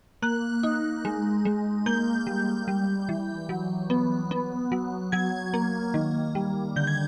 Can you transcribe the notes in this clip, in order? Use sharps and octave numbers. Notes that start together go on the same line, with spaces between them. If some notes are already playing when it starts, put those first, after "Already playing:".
A#3 F#6
D#4
G#3
G#3
A#3 G6
G3
G3
E3
F#3
B3
B3
F#3
F#3 G#6
A#3
D#3
G3
D3 G6
G#6